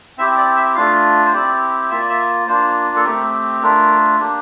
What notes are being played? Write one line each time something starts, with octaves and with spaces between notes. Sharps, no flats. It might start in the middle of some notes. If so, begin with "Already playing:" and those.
C4 E4 G4 E5
D5
E5
A3 D4 F4 F5
C5
C4 E4 G4 D5
A#3 F4 E5
D5
E5
A#3 D4 F4 C5
A4
A3 C4 G4 A#4
A3 D4 F4 A#4
A#3 D4 G4